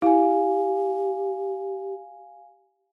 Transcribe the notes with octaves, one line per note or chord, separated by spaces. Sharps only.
E4 G4 F5 G#5